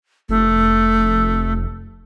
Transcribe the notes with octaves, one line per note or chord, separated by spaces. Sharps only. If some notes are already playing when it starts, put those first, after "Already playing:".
F1 A3